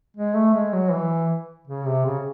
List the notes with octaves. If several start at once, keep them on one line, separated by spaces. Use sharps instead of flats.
G#3
A3
G#3
F#3
E3
C#3
C3
C#3